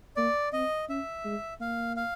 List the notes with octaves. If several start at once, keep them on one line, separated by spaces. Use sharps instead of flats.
A#3 D5
C4 D#5
C#4 E5
G#3
A#3 F5
F5